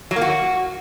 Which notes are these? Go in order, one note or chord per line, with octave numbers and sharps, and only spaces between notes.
F#3
A#3
F#4